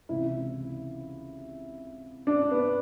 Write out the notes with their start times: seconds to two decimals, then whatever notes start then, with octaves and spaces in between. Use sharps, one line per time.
0.09 C#2 C3 E3 E4
2.27 D4
2.51 B3